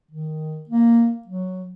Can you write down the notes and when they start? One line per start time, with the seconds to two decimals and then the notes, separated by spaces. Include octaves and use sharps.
0.11 D#3
0.69 A#3
1.27 F#3